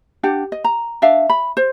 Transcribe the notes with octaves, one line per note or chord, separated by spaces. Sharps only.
D4 G4 F#5
D#5
A#5
D4 E5 F5
B5
C5